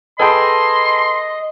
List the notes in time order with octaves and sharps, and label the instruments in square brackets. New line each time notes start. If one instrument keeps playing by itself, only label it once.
[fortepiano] G#4 A4 G5 [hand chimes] B4 A5 B5 [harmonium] D#5 [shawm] C6